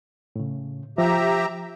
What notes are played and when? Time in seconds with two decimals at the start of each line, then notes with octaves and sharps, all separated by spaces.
0.36 A2 C#3
0.98 F3 G4 E5 A#5